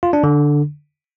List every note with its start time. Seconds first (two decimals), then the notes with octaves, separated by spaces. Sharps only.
0.03 F4
0.13 D4
0.24 D3